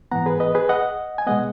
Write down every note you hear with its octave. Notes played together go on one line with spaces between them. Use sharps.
G#2 E3 B3 F#5 A#5
G#4 B4
B4 D#5
G#4 B4
D#5 F#5
G#5
B2 G#3 B3 D#5 F#5